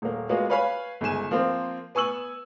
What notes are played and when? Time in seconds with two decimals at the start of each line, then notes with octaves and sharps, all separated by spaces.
0.02 D#1 A#3
0.29 G#3 A#3 B3 F4 F#4
0.50 B4 C#5 F5 G#5 B5
1.01 G1 C#2 D#3 G#5 E7
1.31 F3 A#3 C4
1.95 B3 G#5 C#6 E6 F#7